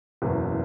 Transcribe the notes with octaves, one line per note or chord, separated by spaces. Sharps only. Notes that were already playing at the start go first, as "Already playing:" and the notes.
F#1 E2 B2